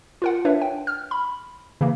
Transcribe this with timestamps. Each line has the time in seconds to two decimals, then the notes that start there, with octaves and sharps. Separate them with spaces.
0.22 F4 A#4 F#5
0.45 D4 B4 C#5 E5
0.62 G5
0.87 F6
1.11 B5
1.81 C#3 E3 A#3